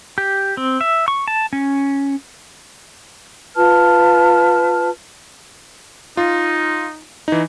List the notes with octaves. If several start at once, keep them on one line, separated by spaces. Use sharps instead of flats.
G4
C4
E5
C#6
A5
C#4
F4 B4 A5 F6
D#4 F4
E3 D#4